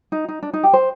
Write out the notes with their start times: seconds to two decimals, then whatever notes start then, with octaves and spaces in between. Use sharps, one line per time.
0.12 D#4
0.28 D#4
0.43 D4
0.53 D#4
0.63 G4
0.73 C5